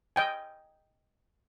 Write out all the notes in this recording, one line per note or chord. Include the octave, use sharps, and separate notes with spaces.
D#5 G5 G#5